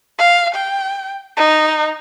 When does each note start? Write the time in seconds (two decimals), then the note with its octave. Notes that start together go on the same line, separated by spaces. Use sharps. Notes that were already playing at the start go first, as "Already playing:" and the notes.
0.19 F5
0.55 G5
1.37 D#4